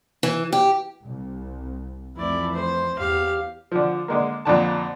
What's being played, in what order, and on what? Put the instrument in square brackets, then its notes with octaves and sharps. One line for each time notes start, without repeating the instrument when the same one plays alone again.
[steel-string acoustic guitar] E3
G4
[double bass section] C2
[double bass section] F2 E3 A3 [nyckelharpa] E4 D5
[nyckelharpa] C5
[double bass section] E2 [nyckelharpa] G4 F5
[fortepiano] D3 F3
D3 G#3 A#3
F2 A#2 D3 A5